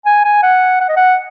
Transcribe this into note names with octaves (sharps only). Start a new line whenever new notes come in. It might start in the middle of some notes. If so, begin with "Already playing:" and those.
G#5
G#5
F#5
F#5
D#5
F#5